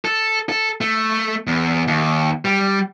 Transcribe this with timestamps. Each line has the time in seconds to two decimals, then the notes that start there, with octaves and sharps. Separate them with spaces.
0.05 A4
0.49 A4
0.81 A3
1.47 E2
1.88 D#2
2.45 G3